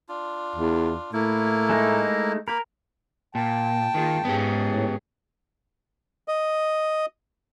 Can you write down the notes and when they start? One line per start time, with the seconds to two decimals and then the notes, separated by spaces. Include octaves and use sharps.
0.09 D4 F4
0.56 E2
1.13 A2 A#3 E4
1.69 G#3 A3 D#4
2.48 A#3 A#4 B5
3.35 A#2 G5 A5
3.95 D#3 A#3 F4 G#4
4.25 G#2 B3 C#4 G4 G#4
4.68 A2
6.28 D#5